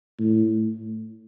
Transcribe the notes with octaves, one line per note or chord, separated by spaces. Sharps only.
A2